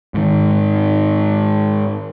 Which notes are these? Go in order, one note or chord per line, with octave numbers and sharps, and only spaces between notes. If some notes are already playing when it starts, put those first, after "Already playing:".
G#2 D#3